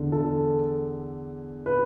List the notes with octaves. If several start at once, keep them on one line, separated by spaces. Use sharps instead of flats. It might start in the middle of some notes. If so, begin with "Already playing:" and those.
Already playing: E2 D3
A4
B4